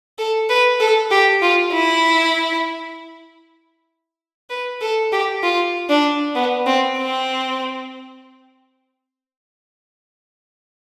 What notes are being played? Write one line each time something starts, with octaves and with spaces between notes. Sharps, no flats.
A4
B4
A4
G4
F4
E4
B4
A4
G4
F4
D4
B3
C4
C4